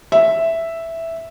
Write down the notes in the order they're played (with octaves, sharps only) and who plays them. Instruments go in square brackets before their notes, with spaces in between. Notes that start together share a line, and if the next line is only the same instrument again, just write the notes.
[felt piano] E5